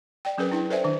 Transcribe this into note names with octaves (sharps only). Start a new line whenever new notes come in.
D5 G5
F#3 C#4 G#4 A#4 B4
D4 E4 G5
A4 B4 C5 D5 E5 G#5
D#3 D4